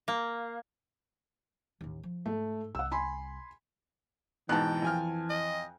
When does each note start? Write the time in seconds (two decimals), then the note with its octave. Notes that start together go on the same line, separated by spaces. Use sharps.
0.08 A#3
1.81 A1 D#2
2.04 F3
2.26 G#2 A3
2.75 C2 F#5 E6
2.92 G#5 B5 C6
4.49 G#2 B2 E3 G5 A5 F#6
4.82 F2 G#5 F6
5.30 D#5